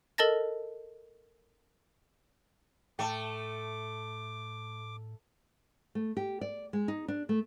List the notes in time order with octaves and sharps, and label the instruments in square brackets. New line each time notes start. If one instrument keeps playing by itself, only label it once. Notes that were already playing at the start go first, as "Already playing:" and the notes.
[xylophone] A4 A#4 D#5 A5 A6 A#6
[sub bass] A2 [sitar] A3 [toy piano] G5 A5 [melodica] D6
[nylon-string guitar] A3
G4
D5
G#3
D#4
D4
A3